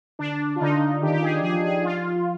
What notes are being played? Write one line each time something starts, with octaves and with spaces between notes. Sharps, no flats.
D3 D4
F4
D3 D#4
D#3 G4
G4
G#4
F3 G#4
G#4
F4